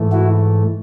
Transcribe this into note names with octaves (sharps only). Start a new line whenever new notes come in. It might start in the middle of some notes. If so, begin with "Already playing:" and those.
Already playing: G#2 E3 A3
E4 F#4